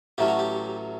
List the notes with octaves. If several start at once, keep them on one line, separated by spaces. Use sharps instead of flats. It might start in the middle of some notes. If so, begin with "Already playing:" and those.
A1 A2 F#3 A3 C#4 G4
F#4
G4